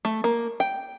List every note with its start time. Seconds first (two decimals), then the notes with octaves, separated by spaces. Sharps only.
0.05 A3
0.24 A#3
0.60 G5